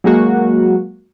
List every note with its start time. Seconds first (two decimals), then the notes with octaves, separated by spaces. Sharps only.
0.04 F#3 G#3 A#3 F#4